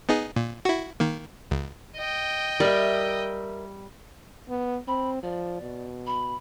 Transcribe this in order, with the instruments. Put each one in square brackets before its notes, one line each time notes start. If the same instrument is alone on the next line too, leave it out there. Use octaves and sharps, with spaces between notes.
[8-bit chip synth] B3 D#4 G#4
A#2
E4 F#4
D#3 A#3
C#2
[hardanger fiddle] D#5 G5
[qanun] G3 [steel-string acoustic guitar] A#4 E5
[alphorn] B3
[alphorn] C4 [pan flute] B5
[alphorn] F3 [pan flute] D5
[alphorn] B2
[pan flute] B5